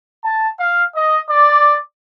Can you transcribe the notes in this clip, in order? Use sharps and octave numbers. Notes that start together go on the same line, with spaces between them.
A5
F5
D#5
D5